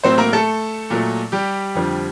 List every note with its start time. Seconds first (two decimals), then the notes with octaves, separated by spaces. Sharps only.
0.03 A2 F#3 A3 C4 C5
0.18 A#3 A#4
0.33 A3 A4
0.90 A#2 F#3 A3
1.32 G3 G4
1.75 F2 D3 F3